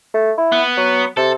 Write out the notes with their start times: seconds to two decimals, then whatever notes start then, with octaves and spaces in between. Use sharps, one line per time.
0.14 A3
0.38 E4
0.52 B3
0.77 F#3
1.17 C3 A4